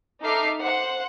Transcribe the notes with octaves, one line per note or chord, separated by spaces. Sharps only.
D#4 A4 E5 D6 F6 C7
C5 F#5